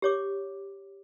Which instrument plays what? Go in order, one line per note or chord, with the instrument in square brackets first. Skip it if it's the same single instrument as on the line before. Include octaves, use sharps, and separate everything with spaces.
[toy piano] G4 C#5 D6